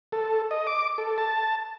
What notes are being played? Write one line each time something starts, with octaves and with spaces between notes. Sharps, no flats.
A4
D#5
D6
A4
A5